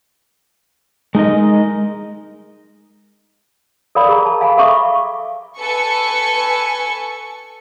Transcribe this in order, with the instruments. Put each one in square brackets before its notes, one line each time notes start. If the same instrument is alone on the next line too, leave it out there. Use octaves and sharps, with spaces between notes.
[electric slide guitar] G#3 D#4 A#4 D#5
[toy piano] A4 A#4 D5 F5 B5
G#4 A#5
A5
F5 G#5 B5
A4 E5 F5 B5 C#6 D6
[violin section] A4 B4 G#5 C#6 C#7